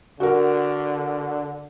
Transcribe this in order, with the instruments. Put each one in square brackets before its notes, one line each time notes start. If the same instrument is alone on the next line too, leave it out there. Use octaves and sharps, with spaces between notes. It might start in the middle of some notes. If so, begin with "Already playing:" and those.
[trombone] D3 [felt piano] F#4 A#4